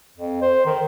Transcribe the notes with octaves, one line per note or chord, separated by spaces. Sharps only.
F2
C5
D#3